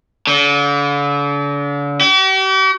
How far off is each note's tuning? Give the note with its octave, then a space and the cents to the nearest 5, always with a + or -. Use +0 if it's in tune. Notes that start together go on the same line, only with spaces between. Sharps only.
D3 -40
G4 -45